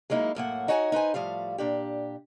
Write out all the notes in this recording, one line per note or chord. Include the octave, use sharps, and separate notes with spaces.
F#3 G#3 A#3 D#4 E4
F#2 A2 A#3 F#5
D#4 F#4 C#5 F#5 G#5
D#4 B4 C5 G#5
A2 F3 G3 F5
A#2 D4 G4